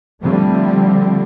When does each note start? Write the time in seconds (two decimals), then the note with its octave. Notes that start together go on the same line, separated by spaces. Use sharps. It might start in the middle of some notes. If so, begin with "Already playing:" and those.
0.22 D3 F3 G3 A3 C4